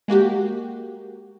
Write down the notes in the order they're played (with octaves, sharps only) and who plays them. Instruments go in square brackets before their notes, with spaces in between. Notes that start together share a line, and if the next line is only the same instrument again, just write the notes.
[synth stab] G#3 A#3 F#4 G4